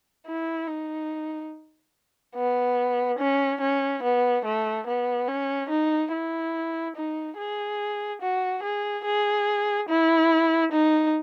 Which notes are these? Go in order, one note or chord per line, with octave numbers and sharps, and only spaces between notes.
E4
D#4
B3
C#4
C#4
B3
A3
B3
C#4
D#4
E4
D#4
G#4
F#4
G#4
G#4
E4
D#4